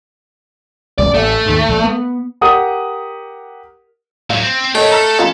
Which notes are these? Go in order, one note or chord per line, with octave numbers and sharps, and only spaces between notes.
E1 C#2 D5
A1 A3
D#2 G#2
A#1
B3
G4 A#4 F#5 D#6
A2 F#3 F5
C4
A2 A3 A#4 C#5 D#5 G5
A4 A#5 F6 B6
F3 C#4 F5 A#5